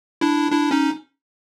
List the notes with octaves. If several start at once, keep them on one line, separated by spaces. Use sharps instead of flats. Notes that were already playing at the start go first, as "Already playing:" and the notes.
D4 E4
D4 E4
C#4 D#4